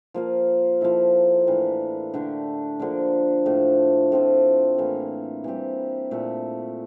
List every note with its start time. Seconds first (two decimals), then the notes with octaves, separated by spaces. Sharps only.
0.14 F3 A#3 F4
0.81 F3 A#3 E4 A4
1.47 A2 E3 A#3 D4
2.13 D3 A3 D4 G4
2.80 D3 F3 A#3 D4
3.46 A2 F3 A3
4.12 A2 F3 C4 F4
4.78 A2 E3 A#3
5.44 E3 G3 C4 G4
6.11 A#2 A3 E4 A4